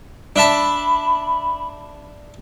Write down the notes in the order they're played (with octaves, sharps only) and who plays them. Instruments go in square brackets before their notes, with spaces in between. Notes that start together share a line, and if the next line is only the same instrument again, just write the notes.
[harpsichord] D4 E5 A5 [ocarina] B5